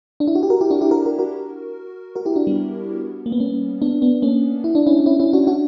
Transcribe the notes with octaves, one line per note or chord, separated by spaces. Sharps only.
D4
E4
F#4
G4
F#4 A#4
E4 G4
D4 F#4
E4 G4
F#4 A#4
F#4 A#4
F#4 A#4
F#4 A#4
E4 G4
D4 F#4
G3 B3
A#3
B3
A#3 C#4
B3 D4
B3 D4
A#3 C#4
E4
D4
C#4 E4
D4
C#4 E4
C#4 E4
D4 F#4
D4 F#4